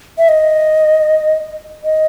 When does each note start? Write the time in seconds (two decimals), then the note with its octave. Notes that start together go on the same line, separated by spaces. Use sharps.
0.18 E5
0.29 D#5
1.84 D#5